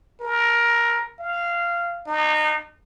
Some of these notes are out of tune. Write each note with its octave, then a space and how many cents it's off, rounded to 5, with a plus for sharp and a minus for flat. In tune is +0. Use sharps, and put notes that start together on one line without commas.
A#4 +15
F5 -15
D#4 -30